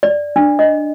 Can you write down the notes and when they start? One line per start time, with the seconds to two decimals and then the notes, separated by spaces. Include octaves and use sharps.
0.03 D5
0.36 D4
0.59 D#5